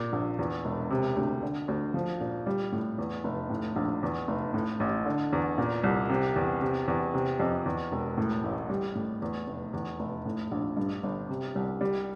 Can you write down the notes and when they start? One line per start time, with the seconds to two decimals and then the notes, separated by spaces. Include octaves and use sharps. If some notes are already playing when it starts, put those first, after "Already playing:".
Already playing: A#2
0.13 A#1
0.39 E2
0.65 E1
0.90 C3
1.16 D2
1.42 D3
1.68 D2
1.94 F3
2.20 A#2
2.46 G3
2.72 A2
2.98 E2
3.24 F1
3.50 A2
3.76 A#1
4.03 E2
4.28 F1
4.54 A2
4.80 A1
5.05 D3
5.33 E2
5.58 A#2
5.84 C2
6.10 C3
6.36 E2
6.61 C3
6.88 E2
7.14 C3
7.40 F2
7.66 E2
7.92 E1
8.17 A2
8.44 A1
8.69 G3
8.95 A2
9.22 E2
9.47 F1
9.73 E2
9.99 F1
10.25 A2
10.51 A#1
10.77 G2
11.03 G1
11.29 C3
11.55 C2
11.81 G3